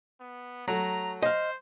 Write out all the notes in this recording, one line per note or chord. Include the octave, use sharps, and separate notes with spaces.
B3
F#3 A3 A#5
C5 D#5 F5